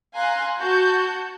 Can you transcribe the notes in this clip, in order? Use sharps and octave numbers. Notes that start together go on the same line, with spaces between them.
F5 G#5 A#5 C6 F#6
F#4 A5 G6